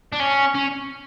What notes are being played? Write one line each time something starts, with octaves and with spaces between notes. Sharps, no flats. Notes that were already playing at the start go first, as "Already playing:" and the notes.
D4
C#4
C#4